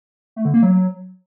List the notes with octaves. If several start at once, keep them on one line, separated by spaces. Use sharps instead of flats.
A3
D3
A#3
F#3